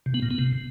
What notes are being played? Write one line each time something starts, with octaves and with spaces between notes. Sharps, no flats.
C3
B3
A#2
B3
C3